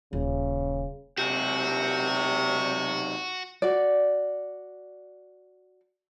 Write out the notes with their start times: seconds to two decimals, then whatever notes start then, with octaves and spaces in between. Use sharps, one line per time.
0.13 D#1 C#3
1.18 B1 C3 F#4 G4
3.62 F#4 D5